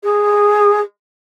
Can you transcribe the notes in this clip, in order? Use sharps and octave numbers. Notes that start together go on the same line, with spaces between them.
G#4